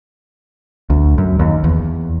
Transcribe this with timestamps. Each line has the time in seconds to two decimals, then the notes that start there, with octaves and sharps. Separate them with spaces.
0.90 D2
1.18 F#2
1.39 D#2
1.64 E2